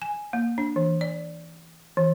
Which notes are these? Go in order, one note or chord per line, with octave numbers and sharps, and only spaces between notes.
G#5
A#3
D4
E3
D5
E3